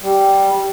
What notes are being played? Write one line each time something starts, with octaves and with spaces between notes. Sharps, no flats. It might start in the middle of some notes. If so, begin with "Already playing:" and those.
G3